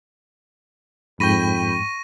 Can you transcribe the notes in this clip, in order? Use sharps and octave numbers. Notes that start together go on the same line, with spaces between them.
F2 G#2 G5 B5 C#6 A#6 D#7